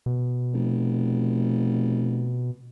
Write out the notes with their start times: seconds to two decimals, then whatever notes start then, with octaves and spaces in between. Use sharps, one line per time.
0.06 B2
0.53 F1